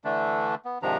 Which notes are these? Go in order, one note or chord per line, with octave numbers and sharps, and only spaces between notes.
D3 E3 A3 D4
B3
G#2 C3 D#3 F3 D4 A#5